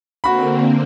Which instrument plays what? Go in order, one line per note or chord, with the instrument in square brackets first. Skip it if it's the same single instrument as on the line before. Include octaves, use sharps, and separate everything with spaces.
[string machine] D3 A#3 C4 [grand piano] F#4 B5